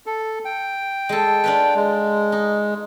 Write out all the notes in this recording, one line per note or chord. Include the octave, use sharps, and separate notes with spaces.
A4
G5
G#3 A4
D4 F4 B4
G#3
D#4